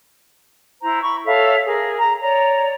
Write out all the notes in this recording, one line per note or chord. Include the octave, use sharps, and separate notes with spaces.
E4 C5 A#5
B5 C#6
A4 C#5 E5 F5
G#4 A#4
A#5
C#5 D5 A#5